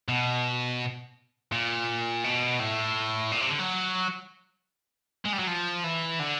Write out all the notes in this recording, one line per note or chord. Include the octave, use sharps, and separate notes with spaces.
B2
A#2
B2
A2
A#2
C3
D3
F#3
G#3
G3
F#3
F3
E3
D3